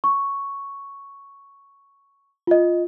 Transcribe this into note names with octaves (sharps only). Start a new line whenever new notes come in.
C#6
F4 D#5